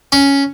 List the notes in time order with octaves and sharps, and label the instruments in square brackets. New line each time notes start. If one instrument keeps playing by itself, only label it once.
[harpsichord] C#4